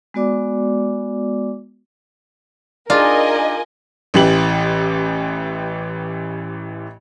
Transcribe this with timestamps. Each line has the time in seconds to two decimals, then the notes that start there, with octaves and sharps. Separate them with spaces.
0.14 G#3 B3 F#4 D5 D6
2.90 D4 D#4 F4 G#4 A#4 D#5 G#5
4.14 A1 E3 G4 F#7